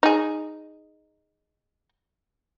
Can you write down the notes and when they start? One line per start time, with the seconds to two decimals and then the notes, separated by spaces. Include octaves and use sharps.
0.03 D#4 G#4